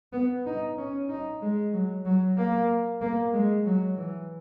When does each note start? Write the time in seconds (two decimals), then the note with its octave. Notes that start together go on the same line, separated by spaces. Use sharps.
0.13 B3
0.46 D#4
0.78 C#4
1.09 D#4
1.42 G#3
1.73 F#3
2.05 F#3
2.37 A#3
3.01 A#3
3.33 G#3
3.66 F#3
3.98 E3